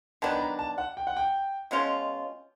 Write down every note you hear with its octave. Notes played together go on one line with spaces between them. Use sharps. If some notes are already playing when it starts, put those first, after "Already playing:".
D#3 F#3 B3 D4 A5
B5
A#5
A5
F#5
G5
F#5
G5
B2 G#3 C#4 F4